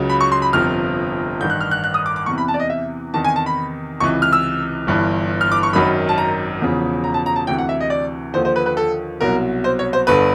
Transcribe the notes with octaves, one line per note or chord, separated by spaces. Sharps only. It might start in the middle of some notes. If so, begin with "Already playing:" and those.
Already playing: C#2 C#3 F#3
B5
C#6
C6
B5
G1 F2 C3 F3 F6
A1 G2 D#3 G6
F#6
F6
F#6
F#6
D#6
D6
D6
E2 C3 E3 C#6
B5
A5
D5
D#5
E5
E2 C3 D#3 A5
G#5
A5
B5
C#2 C3 E3 C#6
F6
E6
G1 G2 E3
F6
D6
C#6
G#1 F#2 D#3 F#3 B5
A5
A#5
E1 E2 C#3 F3
A#5
A5
A#5
A5
D2 C3 E3 G5
F#5
E5
D#5
D5
D#2 D3 F3 C5
C5
B4
B4
A4
C2 B2 F#3 A#4
C5
C#5
C5
G1 G2 D3 B4